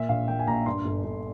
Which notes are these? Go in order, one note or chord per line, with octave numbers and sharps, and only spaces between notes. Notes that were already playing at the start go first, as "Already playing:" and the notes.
Already playing: A#2 E5
A#1 F5
A#2 G5
G#5
A#1 A#5
G2 C6
G1
G1